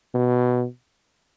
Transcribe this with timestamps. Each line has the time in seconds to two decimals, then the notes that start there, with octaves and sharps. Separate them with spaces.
0.14 B2